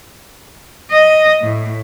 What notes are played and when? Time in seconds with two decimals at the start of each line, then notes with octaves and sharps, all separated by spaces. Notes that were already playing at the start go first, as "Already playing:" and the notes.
0.91 D#5
1.41 A2